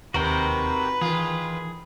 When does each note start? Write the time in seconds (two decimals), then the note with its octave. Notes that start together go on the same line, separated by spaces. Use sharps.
0.14 D#2 C3 D#3 C4 F#4 A#4 B4 G5
1.01 D#3 E3 F4 G#4